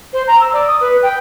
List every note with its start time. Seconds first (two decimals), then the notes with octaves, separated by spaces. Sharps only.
0.13 C5
0.27 A#5
0.40 E6
0.53 D5
0.67 D#6
0.81 B4
1.03 G5